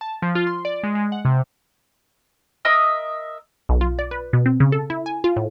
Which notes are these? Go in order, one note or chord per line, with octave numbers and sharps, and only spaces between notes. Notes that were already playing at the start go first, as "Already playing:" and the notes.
A5
F3
F4
C6
D5
G#3
G#3
F#5
C3
A#4 D#5 E5 D#6
B1
F4
D5
B4
B2
C4
C#3
A4
E4
G#5
F4
A2